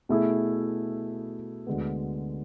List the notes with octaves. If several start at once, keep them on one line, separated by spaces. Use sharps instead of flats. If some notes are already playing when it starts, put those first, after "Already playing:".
B2 A3 E4 G#4
D2 D3 G#3 B3